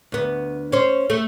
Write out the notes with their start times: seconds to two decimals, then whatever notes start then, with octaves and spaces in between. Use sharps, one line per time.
0.12 D2 B3
0.72 C#4 C5
1.10 A3